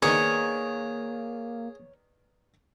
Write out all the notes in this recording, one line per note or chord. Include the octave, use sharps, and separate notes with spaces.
D#3 A#3 B3 D4 G#4 C#5